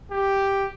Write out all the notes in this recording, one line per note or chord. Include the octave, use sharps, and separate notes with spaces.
G4